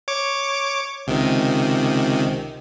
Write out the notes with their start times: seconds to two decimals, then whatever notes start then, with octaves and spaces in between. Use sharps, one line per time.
0.08 C#5 D6
1.07 C#2 C3 D#3